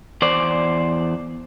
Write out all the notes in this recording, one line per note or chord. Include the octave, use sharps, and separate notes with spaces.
E2 C5 D5